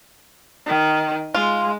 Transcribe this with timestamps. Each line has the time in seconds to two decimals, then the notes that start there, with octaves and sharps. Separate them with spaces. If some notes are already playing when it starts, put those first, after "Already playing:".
0.66 D#3
1.34 G#3 F4